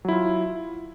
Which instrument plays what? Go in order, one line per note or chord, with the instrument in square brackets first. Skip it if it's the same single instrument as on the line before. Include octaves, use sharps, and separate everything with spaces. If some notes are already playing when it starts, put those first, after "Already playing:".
[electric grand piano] F#3
E4
F4